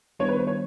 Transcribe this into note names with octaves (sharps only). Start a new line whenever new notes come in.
D#3 G3 B3 D4 C#5
B4
C5
C#5